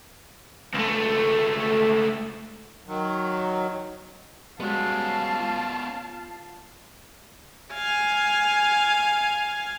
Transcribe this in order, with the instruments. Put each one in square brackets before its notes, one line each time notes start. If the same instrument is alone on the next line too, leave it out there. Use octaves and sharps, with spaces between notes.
[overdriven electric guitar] C#2 A3
[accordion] D#3 F#3
[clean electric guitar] G3 G#3 F#4 [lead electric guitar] B3 C#4 [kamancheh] F5 A5
[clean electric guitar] F4
[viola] F5 G#5